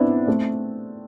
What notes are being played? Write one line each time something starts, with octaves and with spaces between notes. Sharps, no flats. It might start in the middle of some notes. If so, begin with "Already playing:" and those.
Already playing: B3 C4 D4 E4
A3 C4